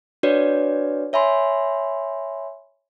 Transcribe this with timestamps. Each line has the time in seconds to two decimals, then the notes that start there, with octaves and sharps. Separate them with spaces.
0.23 D4 F#4 B4 C#5 D5
1.13 C#5 E5 G#5 B5 C6